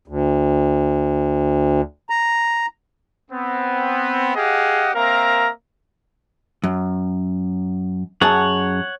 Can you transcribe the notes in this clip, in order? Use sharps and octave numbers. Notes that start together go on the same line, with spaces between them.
D2
A#5
B3 C4
G4 G#4 D#5 F5 F#5
A#3 C4 A#4 E5 F5 A#5
F#2
F#2 G#4 C#5 F#5 A5